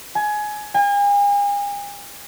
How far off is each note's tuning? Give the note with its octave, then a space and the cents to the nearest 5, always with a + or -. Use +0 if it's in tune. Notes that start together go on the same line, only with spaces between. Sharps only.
G#5 +20
G#5 -40